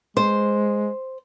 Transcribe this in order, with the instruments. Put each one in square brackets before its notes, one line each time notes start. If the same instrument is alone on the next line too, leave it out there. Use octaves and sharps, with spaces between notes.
[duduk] G#3 [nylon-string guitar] C5